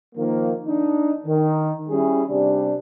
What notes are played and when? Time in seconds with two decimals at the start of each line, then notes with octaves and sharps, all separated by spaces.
0.15 D#3 F3 A#3
0.67 D4 D#4
1.26 D#3
1.89 G3 C#4 E4 G#4
2.28 C3 G3 D4